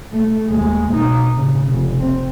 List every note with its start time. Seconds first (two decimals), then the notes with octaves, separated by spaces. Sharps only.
0.12 A3
0.48 D#2 G#3
0.92 B2 D#4
1.34 A2 C#3
1.68 F1
1.99 C4